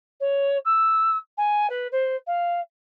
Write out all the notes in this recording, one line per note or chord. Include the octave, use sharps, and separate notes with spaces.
C#5
E6
G#5
B4
C5
F5